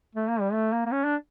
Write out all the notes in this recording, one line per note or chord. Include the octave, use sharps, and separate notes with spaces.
A3
A#3
G3
A3
A#3
A#3
C#4
D4